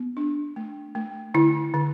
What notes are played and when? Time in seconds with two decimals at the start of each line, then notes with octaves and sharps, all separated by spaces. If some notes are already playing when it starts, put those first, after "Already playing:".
Already playing: B3
0.17 D4
0.56 A3
0.95 A3
1.34 D3 E4
1.74 D3